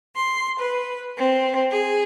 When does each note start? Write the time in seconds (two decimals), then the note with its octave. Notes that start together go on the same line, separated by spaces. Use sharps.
0.14 C6
0.58 B4
1.16 C4
1.71 G#4